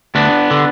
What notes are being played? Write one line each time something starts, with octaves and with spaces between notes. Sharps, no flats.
D2 B3 D4
D3